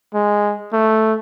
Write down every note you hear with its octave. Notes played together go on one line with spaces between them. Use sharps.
G#3
A3